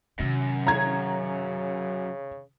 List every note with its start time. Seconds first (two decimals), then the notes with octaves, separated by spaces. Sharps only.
0.20 F#2 C3 D#3
0.67 C#3 A#5 G#6